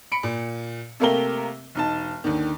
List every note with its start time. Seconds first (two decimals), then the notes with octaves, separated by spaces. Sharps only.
0.12 B5 C#7 D7
0.23 A#2
1.00 C3 A3 A#3 G4 A#4 G7
1.75 E1 D#4 A5
2.24 D#2 D3 D#3